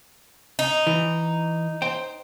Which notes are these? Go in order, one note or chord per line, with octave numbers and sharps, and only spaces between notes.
D#4
E3
C5 G5